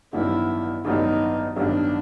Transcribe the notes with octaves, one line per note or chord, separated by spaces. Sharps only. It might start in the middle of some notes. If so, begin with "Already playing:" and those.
A1 G2 D#3 F#3 B3 E4
A1 G2 D#3 F#3 B3 D#4
A1 G2 D#3 F#3 B3 D4